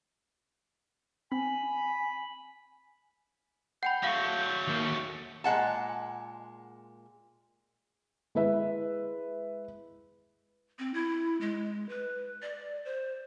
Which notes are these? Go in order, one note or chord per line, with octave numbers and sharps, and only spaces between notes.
C4 G#5 B5
F#5 G5 B5 G6
F#3 A3 F5 A#6
D#2 A#3
A#2 G#3 F#5 A5
G#3 E4 B4 E5
C4
E4
G#3
B4
D5
C5